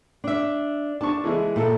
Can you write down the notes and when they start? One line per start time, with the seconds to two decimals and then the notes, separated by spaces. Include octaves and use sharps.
0.24 D4 E5
1.01 D4 A5 C#6
1.24 E3 G#3 E4
1.56 A#2 E4 A4